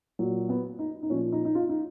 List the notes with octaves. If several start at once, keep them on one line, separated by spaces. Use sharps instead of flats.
A#2 F#3
B3
D#4
D#4
A#2 F3 C#4
D#4
D#4
F4
D#4